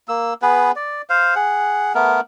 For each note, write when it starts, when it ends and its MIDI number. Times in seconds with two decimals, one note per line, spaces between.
0.08 0.34 58
0.08 0.34 88
0.42 0.71 59
0.42 0.71 68
0.42 0.71 71
0.76 1.02 74
1.10 1.34 72
1.10 1.34 77
1.35 1.93 68
1.35 1.93 78
1.95 2.21 57
1.95 2.21 59
1.95 2.21 70